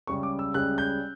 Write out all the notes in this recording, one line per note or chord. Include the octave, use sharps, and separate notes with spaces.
C#2 C#3 G3 C#4 C#6
D6
E6
C#2 C#3 G3 C#4 F#6
G6